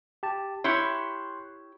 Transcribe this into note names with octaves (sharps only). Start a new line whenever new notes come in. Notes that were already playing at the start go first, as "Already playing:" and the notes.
G4 A5
E4 G4 C#5 C6 F#6